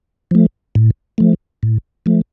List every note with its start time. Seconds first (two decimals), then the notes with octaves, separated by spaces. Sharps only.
0.31 F3 A3
0.75 A2
1.18 F3 A3
1.63 A2
2.06 F3 A3